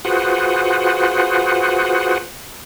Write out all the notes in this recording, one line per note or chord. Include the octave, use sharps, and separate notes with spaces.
F4 F#4 G#4 B4 C5 F#5